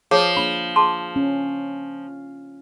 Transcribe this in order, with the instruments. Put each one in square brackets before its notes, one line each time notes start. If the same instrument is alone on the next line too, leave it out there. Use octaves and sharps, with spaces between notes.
[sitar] F3 [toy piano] G#4 C#5
[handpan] A#3 D4 [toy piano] B5
[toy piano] G#4 A5 C6
[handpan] C#4